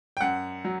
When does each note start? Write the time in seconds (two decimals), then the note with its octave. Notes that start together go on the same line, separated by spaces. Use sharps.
0.17 G5
0.21 F#2 F#5
0.65 F#3